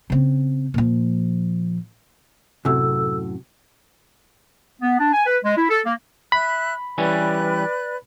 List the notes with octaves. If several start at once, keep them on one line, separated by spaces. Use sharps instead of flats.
C#3 C4
A#2 F3
F#2 A2 C3 F#3 A4 E6
B3
D4
G#5
B4
G#3
E4
A4
A#3
E5 B5 F#6
E3 G3 C#4 B4 D5 F#6